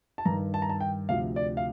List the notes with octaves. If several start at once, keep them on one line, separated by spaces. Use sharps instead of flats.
A5
G2 D#3 A#5
A5
A#5
A5
G5
D2 C3 F3 F5
D5
F5